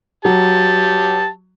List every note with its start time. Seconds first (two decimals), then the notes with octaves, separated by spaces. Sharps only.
0.25 F#3 G4 A5